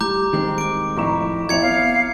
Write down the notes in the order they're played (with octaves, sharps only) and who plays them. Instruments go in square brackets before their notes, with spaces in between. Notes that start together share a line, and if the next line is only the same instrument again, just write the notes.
[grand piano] G3 [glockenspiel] A#5 D6 G6
[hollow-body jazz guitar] D#3 G#3 C4
[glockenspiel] D6 D7
[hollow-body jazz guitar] F2 A2 E4 [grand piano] A#5 C#6 E7
[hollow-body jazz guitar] F2 C4 C#5 [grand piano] E4 F7 [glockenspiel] G#6 C#7
[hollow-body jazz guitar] B3 [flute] F5